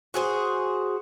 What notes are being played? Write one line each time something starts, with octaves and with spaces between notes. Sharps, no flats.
F#4 G#4 C5